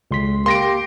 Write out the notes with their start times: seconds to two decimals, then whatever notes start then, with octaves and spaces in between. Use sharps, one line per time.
0.11 C#2 C6 B6
0.46 A#3 G4 C6 A#6 D7